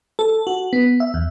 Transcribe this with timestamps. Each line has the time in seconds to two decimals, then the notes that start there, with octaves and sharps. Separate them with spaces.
0.19 A4
0.47 F#4
0.73 B3
1.00 E5
1.14 E2